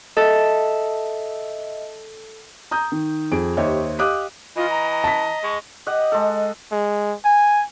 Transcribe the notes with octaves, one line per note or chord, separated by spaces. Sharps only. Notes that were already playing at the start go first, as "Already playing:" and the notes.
A4 D#5 E5
A#5 D#6 G6
D#3
F2 G#4 D7
D#2 G4 C5 C#5 D#5 E5
G4 D#5 F5 D6 D#6 F#6
E3 F4 D#5
A#5
A#5
A5 B6
G#3 C#6
G4 D#5 F#5
G#3 A4
G#3
G#5